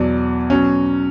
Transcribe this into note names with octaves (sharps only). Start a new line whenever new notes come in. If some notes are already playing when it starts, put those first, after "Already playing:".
Already playing: E2 B2 F#3 D5
B2 F#3 C#4